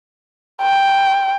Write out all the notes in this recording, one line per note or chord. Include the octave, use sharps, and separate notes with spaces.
G5